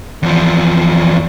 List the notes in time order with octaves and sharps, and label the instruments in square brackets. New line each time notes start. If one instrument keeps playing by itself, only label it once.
[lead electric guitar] E2 F3